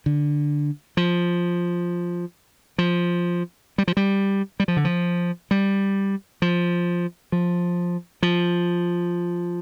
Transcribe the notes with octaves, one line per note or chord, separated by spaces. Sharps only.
D3
F3
F3
G3
F3
G3
G3
F3
D3
F3
G3
F3
F3
F3